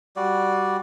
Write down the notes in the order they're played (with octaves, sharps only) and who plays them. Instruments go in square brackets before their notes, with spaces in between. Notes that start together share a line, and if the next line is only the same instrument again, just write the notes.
[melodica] G3 F#4 D5